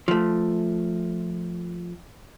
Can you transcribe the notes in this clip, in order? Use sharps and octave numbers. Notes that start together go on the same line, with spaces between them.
F3 A3